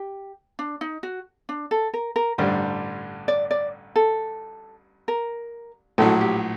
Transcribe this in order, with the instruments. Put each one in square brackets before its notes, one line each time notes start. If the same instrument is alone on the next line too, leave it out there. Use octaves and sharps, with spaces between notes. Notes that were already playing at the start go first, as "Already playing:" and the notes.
Already playing: [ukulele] G4
D4
D#4
F#4
D4
A4
A#4
A#4
[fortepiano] A1 G2 D3 G3 [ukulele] C5
[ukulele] D5
D5
A4
A#4
[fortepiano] A#1 A2 F#3 [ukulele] A4
[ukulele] G4